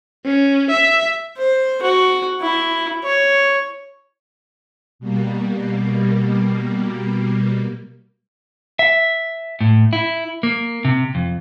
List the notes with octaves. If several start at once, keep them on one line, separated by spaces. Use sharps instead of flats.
C#4
E5
C5
F#4
E4
C#5
B2 G3 A#3
E5
A2
E4
A#3
C3
F2